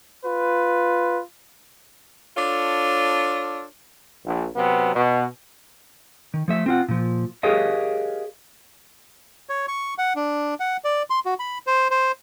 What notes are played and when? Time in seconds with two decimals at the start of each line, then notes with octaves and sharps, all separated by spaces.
0.24 F4 B4
2.37 D4 F4 A4 C#5
4.25 A#1
4.56 C3 F#3 B3
4.96 B2
6.34 D#3
6.48 F3 A3 E5
6.66 C4 F4 F#5
6.89 A#2 F3
7.43 G4 G#4 A#4 C#5 D#5 F5
9.49 C#5
9.68 C#6
9.98 F#5
10.16 D4
10.60 F#5
10.84 D5
11.10 C6
11.26 F#4
11.39 B5
11.67 C5
11.90 C5